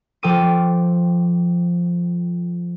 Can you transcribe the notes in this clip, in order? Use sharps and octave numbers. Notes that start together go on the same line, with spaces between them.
F3 A4 G5 D6 D#7